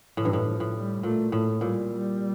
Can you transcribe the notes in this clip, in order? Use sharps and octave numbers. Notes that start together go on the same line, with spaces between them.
A2 E3
G2
A2
F3
A2
G3
A#2 A3
A2 A3
A#2 G3
G3